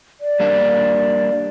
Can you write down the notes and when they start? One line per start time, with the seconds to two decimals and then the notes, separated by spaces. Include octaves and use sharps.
0.21 D5
0.40 G3 A#3 D4